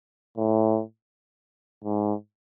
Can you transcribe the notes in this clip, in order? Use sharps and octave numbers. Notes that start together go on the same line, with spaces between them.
A2
G#2